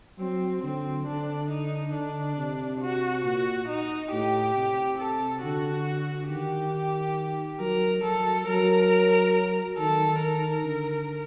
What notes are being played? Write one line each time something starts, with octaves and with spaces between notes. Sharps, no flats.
F#3 C4
D3 C4
D3 D4
D#4
D3 D4
C3
F#4
A#2 F#4
D#4
A2 G4
C3
A4
D3 F#4
D#3 G4
F#3 A#4
F#3 A4
F#3 A#4
D#3 A4
A#4
D3